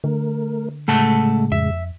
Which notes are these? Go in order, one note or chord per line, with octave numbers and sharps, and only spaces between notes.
D3 A3 A#4
A2 C#3 G#3 A3 F#5 A5
F2 E5